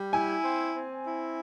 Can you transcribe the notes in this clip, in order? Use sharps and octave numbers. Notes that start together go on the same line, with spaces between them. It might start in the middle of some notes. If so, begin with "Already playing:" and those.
Already playing: G3
E4 G#5
C4
C4
E4